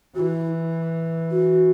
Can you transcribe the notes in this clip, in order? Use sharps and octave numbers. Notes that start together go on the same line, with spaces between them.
E3 E4 F#4
F#4